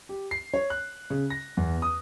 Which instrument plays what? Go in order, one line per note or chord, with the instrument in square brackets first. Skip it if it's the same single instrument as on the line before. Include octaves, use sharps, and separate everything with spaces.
[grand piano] G4
C7
C#5
F#6
C#3
A#6
E2
D#6